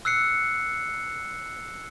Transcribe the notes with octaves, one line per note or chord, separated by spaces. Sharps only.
E6 F#6 C7 C#7